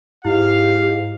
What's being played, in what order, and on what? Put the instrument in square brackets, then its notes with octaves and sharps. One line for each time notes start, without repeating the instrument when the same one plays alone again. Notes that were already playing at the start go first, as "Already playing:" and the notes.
[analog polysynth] G#2 [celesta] E4 [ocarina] G4 [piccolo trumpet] F5